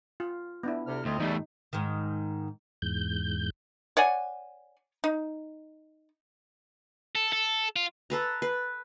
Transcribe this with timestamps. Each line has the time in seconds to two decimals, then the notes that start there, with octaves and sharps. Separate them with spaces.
0.20 F4
0.63 B3 D4 E4
0.87 D2 C3 F6
1.06 D2 C4 F4 D#5
1.20 E2 A2 G3 A3 D#4
1.73 G#2 D#3
2.82 E2 G#2 G6
3.97 C#5 D5 F#5 G#5
5.04 D#4
7.15 A4
7.33 A4
7.76 F4
8.10 A4 B4 A#5
8.42 B4